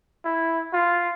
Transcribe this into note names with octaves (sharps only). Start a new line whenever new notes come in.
E4
F4